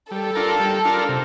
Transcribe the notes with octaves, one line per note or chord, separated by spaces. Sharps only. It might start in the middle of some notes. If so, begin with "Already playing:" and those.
G3 A4
D4 F4 A#4
G3
D4 F4 A#4
C3